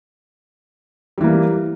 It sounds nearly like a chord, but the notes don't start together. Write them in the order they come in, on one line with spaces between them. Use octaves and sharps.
G3 E3 A#3